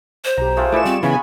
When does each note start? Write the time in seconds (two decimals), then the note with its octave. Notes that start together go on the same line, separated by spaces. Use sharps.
0.25 C5
0.37 B1 G4 A#5
0.57 G#3 A3 F4
0.72 A3 E4 F4 B4 D5 G#5 C#6 E7
0.85 G3 C4
1.03 C#3 E3 B3 C#4 G#5 B5